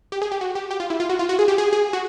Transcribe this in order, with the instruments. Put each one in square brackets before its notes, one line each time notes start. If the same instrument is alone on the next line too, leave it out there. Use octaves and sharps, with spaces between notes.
[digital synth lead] G4
G#4
G4
F#4
G4
G4
F4
E4
F4
F#4
F4
F#4
G#4
G4
G#4
G#4
F#4